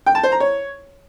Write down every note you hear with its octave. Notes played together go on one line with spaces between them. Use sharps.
G5
A5
C5
A#5
C#5